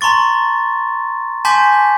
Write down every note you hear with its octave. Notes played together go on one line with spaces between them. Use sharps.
A5 A#5 C6 C#6 A6
G#5 A5 C6 D6 G6 B6